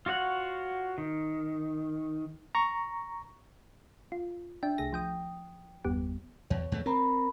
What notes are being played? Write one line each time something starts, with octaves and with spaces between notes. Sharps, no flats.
F4 F#4 C#5 F#5
D#3
A#5 C#6
F4
D4 E5 G5
C2 A3 G#4 A#6
F3 G5 D#6
G1 E2 G3 B3 G4
E2 C#5
E2 A3
C4 A#4 A#5 B5